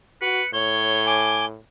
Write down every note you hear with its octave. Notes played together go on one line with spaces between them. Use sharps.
F#4 B4 C#7
A2 C#5 G7
G#5 D6